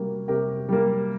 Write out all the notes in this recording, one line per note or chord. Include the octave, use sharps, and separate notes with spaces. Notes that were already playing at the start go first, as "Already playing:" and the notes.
Already playing: C3 G3 A#3 F#4
C3 G4 A#4
G3 A#3